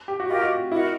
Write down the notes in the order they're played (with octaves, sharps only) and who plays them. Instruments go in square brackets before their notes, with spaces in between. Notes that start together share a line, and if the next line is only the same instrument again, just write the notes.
[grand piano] G4
F#4
[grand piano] F4 [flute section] G4 A#4 D#5
[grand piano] F#4
[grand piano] E4 [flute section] F#4 A#4 D#5